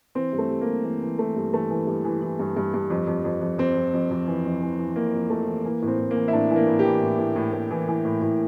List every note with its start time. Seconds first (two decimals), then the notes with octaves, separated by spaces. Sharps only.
0.15 E3 C4
0.33 G2
0.38 A3
0.50 G2
0.61 A#3
0.67 G2
0.84 E3 A#3
1.02 E3
1.19 E3 A3
1.36 G2
1.53 E3 A3
1.70 E3
1.87 G2
2.04 E3
2.22 E3
2.39 G2
2.57 G2
2.74 G2
2.90 F2
3.07 F2
3.25 F2
3.41 F2
3.58 F2 C4
3.76 F2
3.93 F2
4.10 F2
4.27 E3
4.45 F2
4.62 E3
4.79 E3
4.96 F2 A#3
5.14 F2
5.30 F2 A3
5.47 E3
5.64 E3 A#3
5.82 A2
5.87 C4
5.99 A2
6.11 A#3
6.16 E3
6.28 E4
6.33 A2 D4
6.51 E3
6.56 A#3
6.67 A2
6.79 G4
6.84 E3
7.02 A2
7.19 A2
7.36 A2
7.53 A2
7.71 E3
7.88 E3
8.05 A2
8.21 A2